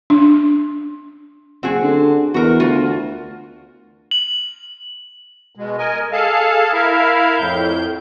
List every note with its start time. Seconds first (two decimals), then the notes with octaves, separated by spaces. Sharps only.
0.10 D4
1.63 F#1 C4 F#4 G#4
1.82 D3
2.34 E2 F#4 A#4
2.60 D2 F4 F#4
4.11 F#7
5.55 B2 G#3
5.78 A#4 D#5 G#5
6.12 G#4 A4 F5 A5
6.73 E4 A#4 E5 F5
7.37 F2 A2 G6